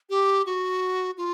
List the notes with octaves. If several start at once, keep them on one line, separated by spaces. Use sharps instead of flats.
G4
F#4
F4